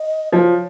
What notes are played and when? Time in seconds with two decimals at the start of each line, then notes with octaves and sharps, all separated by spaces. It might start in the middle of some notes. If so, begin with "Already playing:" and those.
Already playing: D#5
0.33 F3 C#5